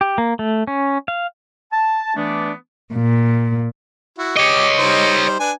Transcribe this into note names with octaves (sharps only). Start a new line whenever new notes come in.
G4
A#3
A3
C#4
F5
A5
E3 A3 B3 D4
A#2
E4 F#4
G4 C#5 D#5 D6
G3 D#4 C5
D4 B4 G#5